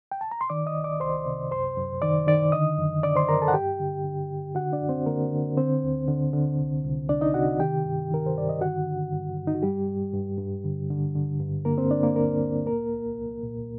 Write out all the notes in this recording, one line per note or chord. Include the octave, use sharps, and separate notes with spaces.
G5
A5
A#5
C6
D#3 D5 D6
D#5 D#6
C2
D5 D6
C2 C5 C6
C3
F#2 C5 C6
F#2
D#3 D5 D6
D#3 D5 D6
D3 D#5 D#6
F#2
D3 D5 D6
C5 C6
F#2 A#4 A#5
A4 A5
F#5
G2 G4 G5
D3
D3
D3
D3 F#4 F#5
D4 D5
F#2
C4 C5
D3 A#3 A#4
D3
D3 C4 C5
D2
D3
D3
C2
C2
C2 D4 D5
D#4 D#5
C3 F#4 F#5
D#3 G4 G5
G2
D#3 A#4
C5
G2 D5
D#5
D3 F#4 F#5
D3
G2
G2
D#4
F#4
G2 G3 G4
G2
G2
G2
D3
D3
D3
G2
D3 A#3 A#4
C4 C5
D3 D4 D5
A#3 A#4
D2 A#3 A#4
D2
A#2 A#3 A#4
C2
C2
A#2